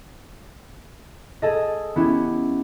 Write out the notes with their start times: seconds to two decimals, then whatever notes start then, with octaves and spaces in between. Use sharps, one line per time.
1.42 G#4 A4 D#5
1.96 B3 C#4 E4 G4